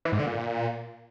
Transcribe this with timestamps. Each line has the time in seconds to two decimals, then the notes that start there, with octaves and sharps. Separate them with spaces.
0.05 E3
0.12 G#2
0.19 D3
0.26 A#2